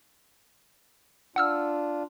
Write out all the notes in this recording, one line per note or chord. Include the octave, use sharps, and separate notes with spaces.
D4 F4 F#5 E6 F6